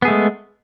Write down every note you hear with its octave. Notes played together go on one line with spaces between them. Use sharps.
G#3 A3 B3 G#4